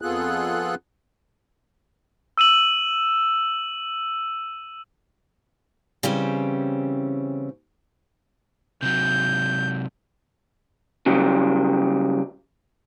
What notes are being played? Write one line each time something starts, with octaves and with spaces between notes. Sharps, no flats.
F2 B3 F4 G#4 A4 F#6
E6 D#7 E7 F#7
C#3 E3 G3 C4 C#4
C3 F#3 G6
C#3 F#3 G3